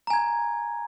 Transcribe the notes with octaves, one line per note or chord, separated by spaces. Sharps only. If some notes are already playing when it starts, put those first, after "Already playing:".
G#5 A#5 G#6